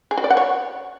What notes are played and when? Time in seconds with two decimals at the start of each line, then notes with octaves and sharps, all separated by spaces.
0.11 G#4
0.18 F#4
0.24 D5
0.30 F#5
0.37 C#5